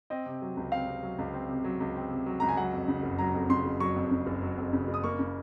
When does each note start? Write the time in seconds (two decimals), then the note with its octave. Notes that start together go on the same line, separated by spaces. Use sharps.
0.10 C4 D#5
0.26 C3
0.42 F#3
0.57 C#2
0.72 C4 F5
0.87 C3
1.03 F#3
1.19 C#2
1.34 C4
1.49 C3
1.64 F#3
1.80 C#2
1.96 C4
2.11 C3
2.26 F#3
2.40 C#2 A#5
2.49 G#5
2.57 F#3 F#5
2.73 F2
2.88 C#3
3.03 F#1
3.19 F#3 A#5
3.34 F2
3.49 C#3 C6
3.65 F#1
3.80 F#3 C#6
3.96 F2
4.11 C#3
4.27 F#1
4.42 F#3
4.58 F2
4.73 C#3
4.88 F#1
4.94 D#6
5.04 A#3 C#6
5.19 C#3